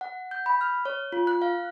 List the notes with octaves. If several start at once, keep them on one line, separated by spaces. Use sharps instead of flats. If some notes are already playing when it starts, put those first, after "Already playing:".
F#5
G6
B5
F6
C#5
F4
F#6
F5